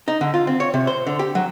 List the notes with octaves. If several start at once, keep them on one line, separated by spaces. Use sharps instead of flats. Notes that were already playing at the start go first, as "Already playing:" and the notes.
D#4
D3
F4
C4
C#5
C3
C5
D3
G4
F#3